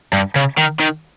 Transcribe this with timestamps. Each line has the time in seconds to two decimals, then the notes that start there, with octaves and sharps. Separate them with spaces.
0.13 G2
0.36 C#3
0.58 D#3
0.80 D#3